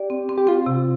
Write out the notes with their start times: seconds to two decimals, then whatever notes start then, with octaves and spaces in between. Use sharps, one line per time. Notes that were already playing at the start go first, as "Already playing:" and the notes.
Already playing: G4 D5
0.10 C4
0.29 C4
0.38 G4
0.47 C4 F4
0.66 C3